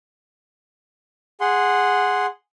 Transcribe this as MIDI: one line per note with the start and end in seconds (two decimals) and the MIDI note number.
1.41 2.26 68
1.41 2.26 78
1.41 2.26 84